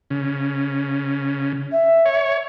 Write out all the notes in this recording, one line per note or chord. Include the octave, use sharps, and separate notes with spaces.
C#3
E5
C#5